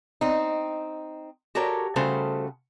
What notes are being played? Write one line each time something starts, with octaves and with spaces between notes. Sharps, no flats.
C4 D#4
F#4 G4 A4 A#4 C#5
C#3 G3 A3 F#4 A4 C5